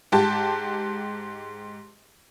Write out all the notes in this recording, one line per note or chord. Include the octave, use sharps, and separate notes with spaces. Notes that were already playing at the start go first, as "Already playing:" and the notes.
G#2 G4 A5